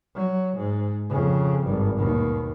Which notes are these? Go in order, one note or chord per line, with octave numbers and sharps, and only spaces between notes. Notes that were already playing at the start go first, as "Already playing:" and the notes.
F#3
G#2
F2 C#3
G#1 G2
D#2 B2